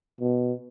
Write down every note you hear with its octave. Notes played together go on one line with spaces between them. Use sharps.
B2